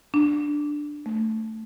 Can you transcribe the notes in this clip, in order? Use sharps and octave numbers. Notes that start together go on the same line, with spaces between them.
D4
A3